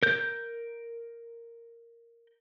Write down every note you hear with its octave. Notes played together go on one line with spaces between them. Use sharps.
A#4 G6